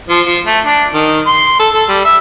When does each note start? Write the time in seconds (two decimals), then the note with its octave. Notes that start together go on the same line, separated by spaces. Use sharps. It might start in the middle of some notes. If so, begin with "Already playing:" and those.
0.09 F3
0.27 F3
0.46 A3
0.65 D4
0.93 D#3
1.27 C6
1.59 A4
1.73 A4
1.89 G3
2.05 E5